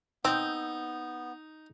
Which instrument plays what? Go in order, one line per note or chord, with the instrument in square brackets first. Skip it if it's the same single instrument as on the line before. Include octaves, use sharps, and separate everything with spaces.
[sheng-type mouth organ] B3 [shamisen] C4 [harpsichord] D#4 [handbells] E6 G6